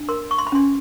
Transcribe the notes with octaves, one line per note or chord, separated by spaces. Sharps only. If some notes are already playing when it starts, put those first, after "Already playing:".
Already playing: D4
A#4 C6
C#6
C6
B5
C#4 C6